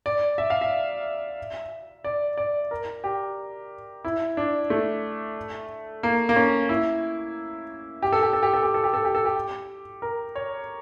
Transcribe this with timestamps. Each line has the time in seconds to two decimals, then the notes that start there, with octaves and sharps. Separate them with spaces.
0.06 D5
0.38 E5
0.50 F5
0.61 E5
2.04 D5
2.38 D5
2.71 A#4
3.04 G4
4.04 E4
4.37 D4
4.70 A3
6.03 A#3
6.29 A#3
6.36 C#4
6.69 E4
8.03 G4
8.12 A4
8.23 G4
8.33 A4
8.43 G4
8.53 A4
8.63 G4
8.74 A4
8.84 G4
8.94 A4
9.05 G4
9.15 A4
9.25 G4
10.02 A#4
10.36 C#5